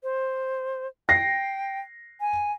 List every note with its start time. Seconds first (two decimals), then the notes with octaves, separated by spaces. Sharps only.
0.03 C5
1.09 G5 A#6 C7
2.20 G#5